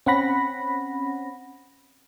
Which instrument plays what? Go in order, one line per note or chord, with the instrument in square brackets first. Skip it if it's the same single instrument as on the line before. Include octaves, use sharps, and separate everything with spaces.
[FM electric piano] C4 C#4 F#5 B5 A#6